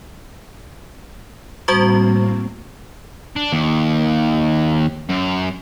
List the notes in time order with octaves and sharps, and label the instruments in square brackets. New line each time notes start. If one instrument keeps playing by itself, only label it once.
[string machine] A2 A#3 C4 [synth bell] G3 F#4 C#6
[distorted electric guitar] D4
D#2
F#2